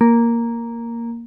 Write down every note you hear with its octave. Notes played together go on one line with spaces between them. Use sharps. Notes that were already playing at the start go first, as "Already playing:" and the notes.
A#3